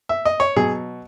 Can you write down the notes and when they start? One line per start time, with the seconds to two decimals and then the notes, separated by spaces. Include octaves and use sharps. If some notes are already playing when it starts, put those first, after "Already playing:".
0.09 E5
0.25 D#5
0.40 C#5
0.56 B2 F#3 G#4